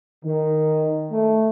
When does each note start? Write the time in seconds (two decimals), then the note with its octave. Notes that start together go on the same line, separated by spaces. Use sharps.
0.24 D#3
1.12 A3